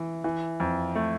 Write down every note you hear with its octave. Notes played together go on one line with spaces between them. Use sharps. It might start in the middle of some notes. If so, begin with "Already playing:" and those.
Already playing: E3
E3
F2
A3